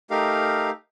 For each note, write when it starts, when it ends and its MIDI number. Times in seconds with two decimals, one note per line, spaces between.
0.10 0.70 57
0.10 0.70 63
0.10 0.70 67
0.10 0.70 70
0.10 0.70 77